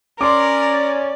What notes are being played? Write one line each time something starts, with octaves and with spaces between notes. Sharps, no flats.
C#4 A#4 D5 C6 D6